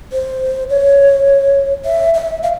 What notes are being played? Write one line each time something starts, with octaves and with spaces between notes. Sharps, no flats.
C5
C#5
E5
E5
F5